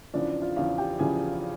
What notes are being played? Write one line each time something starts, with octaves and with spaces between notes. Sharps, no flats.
E2 C#3 F3 D4 D5
F4 F5
E2 C#3 F3 F4 F5
G4 G5
E2 C#3 F3 G#4 G#5